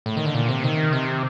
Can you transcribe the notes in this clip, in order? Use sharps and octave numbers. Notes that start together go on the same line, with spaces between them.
A2
D#3
D3
A#2
C3
D#3
C3